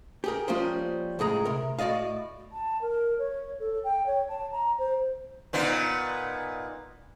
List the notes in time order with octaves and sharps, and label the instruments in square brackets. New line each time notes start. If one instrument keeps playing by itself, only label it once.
[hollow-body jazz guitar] G4 G#4 A#4
F3 G3 A#3 C#4 C5
C#2 A2 G#4 A#5
C3 A#4
A2 F#4 D5 D#5 F5
[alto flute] A5
A#4
C#5
A4
G5
C#5
A5
A#5
C5
[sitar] A#2 B3 D#4